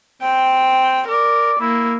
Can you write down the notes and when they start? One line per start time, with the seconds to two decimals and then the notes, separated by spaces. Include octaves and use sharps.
0.22 C4 G5
1.08 A#4 D5
1.60 A#3 E4